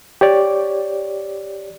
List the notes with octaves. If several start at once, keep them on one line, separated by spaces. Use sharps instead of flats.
G4 C#5 D5